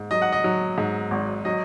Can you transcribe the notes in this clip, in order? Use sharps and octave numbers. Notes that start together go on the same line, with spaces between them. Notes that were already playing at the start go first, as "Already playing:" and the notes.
Already playing: G#2
F#3 D#5
F#5
D#5
F#3
G#2
G#1
F#3 D#5